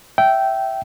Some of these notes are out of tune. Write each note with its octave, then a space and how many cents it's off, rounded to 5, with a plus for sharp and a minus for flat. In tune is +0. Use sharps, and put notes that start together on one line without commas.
E5 +0 G5 -15